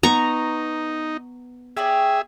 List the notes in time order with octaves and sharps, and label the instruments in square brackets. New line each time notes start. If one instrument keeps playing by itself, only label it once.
[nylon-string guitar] B3 [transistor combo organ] D#4 [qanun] A#5 C#6
[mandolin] G4 C#5 D5 [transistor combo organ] G#4 E5